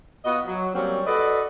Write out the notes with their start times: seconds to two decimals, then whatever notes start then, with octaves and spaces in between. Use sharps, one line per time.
0.25 B3 F4 F#4 D#5
0.46 F#3
0.74 F#3 G3 A#3 C4 C#4
1.06 F#4 A4 B4 D5 D#5